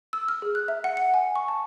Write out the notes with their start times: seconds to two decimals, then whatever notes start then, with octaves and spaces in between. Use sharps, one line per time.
0.13 E6
0.28 F6
0.42 G#4
0.55 F#6
0.68 E5
0.84 F#5
0.97 C#7
1.14 G#5
1.36 C#6
1.48 A5